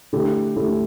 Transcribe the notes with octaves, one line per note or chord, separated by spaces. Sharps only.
D3 A3 E4 G4
D3 A3 E4 G4